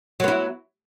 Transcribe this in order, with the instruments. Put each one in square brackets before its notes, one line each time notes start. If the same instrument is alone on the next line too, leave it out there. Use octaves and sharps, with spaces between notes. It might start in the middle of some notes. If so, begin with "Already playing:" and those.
[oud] F#3
B3
E4